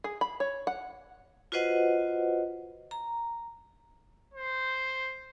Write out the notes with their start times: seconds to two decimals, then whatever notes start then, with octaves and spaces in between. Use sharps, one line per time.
0.04 G#4
0.21 B5
0.40 C#5
0.67 F#5
1.52 F4 F#4 B4 C5 D#5 F#5
2.91 A#5
4.34 C5